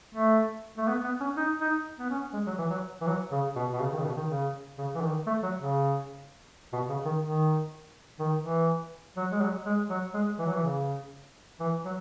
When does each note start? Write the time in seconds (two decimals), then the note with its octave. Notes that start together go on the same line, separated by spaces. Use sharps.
0.15 A3
0.78 A3
0.88 B3
1.04 B3
1.21 C#4
1.37 D#4
1.61 D#4
1.99 B3
2.10 C#4
2.34 G#3
2.47 F#3
2.59 E3
2.70 F#3
3.01 E3
3.07 F#3
3.32 C#3
3.56 B2
3.73 B2
3.80 C#3
3.93 D#3
3.99 C#3
4.05 B2
4.17 D#3
4.29 C#3
4.78 C#3
4.95 E3
5.03 D#3
5.27 A3
5.43 F#3
5.59 C#3
6.73 B2
6.89 C#3
7.05 D#3
7.22 D#3
8.20 D#3
8.43 E3
9.17 F#3
9.32 G#3
9.41 F#3
9.66 G#3
9.90 F#3
10.14 G#3
10.39 E3
10.46 F#3
10.54 E3
10.63 C#3
11.60 E3
11.85 F#3